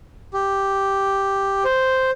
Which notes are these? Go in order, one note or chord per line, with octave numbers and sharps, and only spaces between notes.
G4
C5